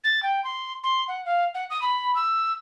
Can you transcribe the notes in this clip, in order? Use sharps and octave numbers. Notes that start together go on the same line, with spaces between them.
A6
G5
C6
C6
F#5
F5
F#5
D#6
B5
E6